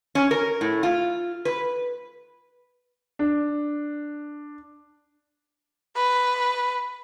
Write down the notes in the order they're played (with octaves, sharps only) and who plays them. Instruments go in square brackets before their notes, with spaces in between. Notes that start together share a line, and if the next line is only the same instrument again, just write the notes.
[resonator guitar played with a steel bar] C#4
A#4
A2
F4
B4
[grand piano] D4
[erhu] B4